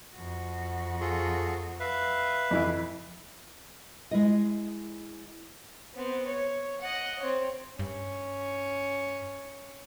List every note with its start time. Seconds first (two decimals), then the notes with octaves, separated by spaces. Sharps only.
0.15 F2 F#4
1.01 F4 G#4 A4
1.80 B4 E5 F5
2.51 F2 E3 E4
4.11 G#3 E4 D#5
5.95 B3 C4
6.27 C#5
6.81 D#5 F#5
7.19 C4 C#5
7.79 G2 C#4